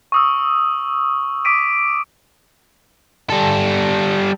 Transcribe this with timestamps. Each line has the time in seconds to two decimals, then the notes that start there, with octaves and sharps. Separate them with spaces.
0.12 C#6 D#6 E6
1.45 D6 E6 B6 D7 D#7
3.30 G3 A4